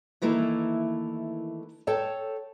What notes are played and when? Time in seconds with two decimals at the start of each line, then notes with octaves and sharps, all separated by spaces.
0.22 D#3 E3 A3 A#3 E4
1.87 A4 C#5 G5 A5